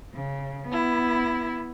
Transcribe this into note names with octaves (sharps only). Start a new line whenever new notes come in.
C#3
B3 E4